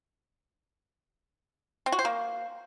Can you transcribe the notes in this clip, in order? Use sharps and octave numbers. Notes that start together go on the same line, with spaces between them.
C4
F#4
C5
A#3